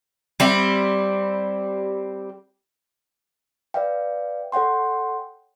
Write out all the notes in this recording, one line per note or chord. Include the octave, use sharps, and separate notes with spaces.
G3 C4 E4
B4 D5 E5 F5 G5
A4 C#5 F#5 G5 C6